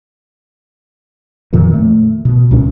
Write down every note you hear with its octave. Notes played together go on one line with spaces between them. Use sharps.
F2 A#2 D#3 F3
A3
B2
C#2 A#2 C#4